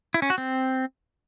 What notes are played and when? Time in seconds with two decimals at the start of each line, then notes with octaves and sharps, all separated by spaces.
0.14 E4
0.22 C#4
0.30 F#4
0.38 C4